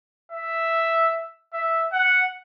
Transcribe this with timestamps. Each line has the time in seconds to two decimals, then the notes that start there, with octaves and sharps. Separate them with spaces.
0.32 E5
1.54 E5
1.93 F#5